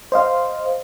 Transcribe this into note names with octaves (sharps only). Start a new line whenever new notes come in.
C5 D#5 F5